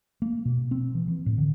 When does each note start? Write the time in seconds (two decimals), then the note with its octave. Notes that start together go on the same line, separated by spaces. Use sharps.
0.22 A#3
0.45 B2
0.71 C4
0.95 E3
1.08 E3
1.26 A2
1.38 D3